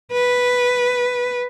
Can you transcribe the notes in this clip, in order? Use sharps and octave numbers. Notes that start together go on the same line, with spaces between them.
B4